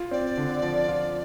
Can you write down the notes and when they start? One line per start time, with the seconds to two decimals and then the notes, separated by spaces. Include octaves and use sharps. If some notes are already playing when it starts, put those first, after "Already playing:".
Already playing: F4
0.11 C4 D5
0.37 D3
0.63 F3
0.88 F4